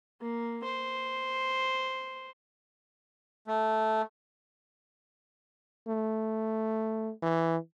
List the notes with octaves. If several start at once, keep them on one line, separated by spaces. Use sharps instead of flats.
A#3
C5
A3
A3
E3